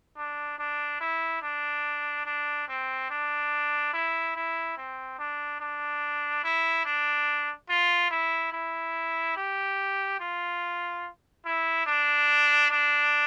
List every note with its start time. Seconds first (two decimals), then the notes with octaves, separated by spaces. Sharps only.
0.17 D4
0.59 D4
1.01 E4
1.42 D4
2.26 D4
2.68 C4
3.10 D4
3.93 E4
4.36 E4
4.77 C4
5.19 D4
5.61 D4
6.44 E4
6.85 D4
7.69 F4
8.11 E4
8.53 E4
9.37 G4
10.20 F4
11.46 E4
11.87 D4
12.71 D4